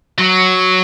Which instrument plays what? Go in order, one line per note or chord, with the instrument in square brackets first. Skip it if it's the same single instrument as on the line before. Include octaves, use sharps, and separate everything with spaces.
[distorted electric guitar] F#3